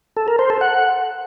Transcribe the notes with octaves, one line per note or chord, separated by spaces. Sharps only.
A4
A#4
C5
A4
F#5